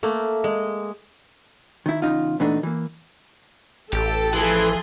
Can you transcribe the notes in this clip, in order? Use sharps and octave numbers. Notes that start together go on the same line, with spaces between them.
A3 A#3
G#3
D#3 E4
E2 C#3 D#4 F4
A#2 E3 A3 B3 D4 D#4
E3 A#3
A1 G4 A4
E3 F3 G#4 C6